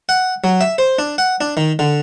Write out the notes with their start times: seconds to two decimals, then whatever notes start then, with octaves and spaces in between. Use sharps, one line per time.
0.09 F#5
0.44 F#3
0.61 E5
0.78 C5
0.99 D4
1.18 F#5
1.41 D4
1.57 D#3
1.79 D3